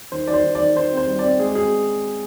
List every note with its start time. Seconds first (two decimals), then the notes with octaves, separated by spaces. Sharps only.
0.12 D#3 C5
0.27 D#3 D5
0.34 C5
0.44 D#3
0.55 D#3 D5
0.76 D#3 C5
0.92 C4
0.97 C5
1.07 G3
1.19 D5
1.24 C4
1.39 G#3 G#4
1.55 C4 G#4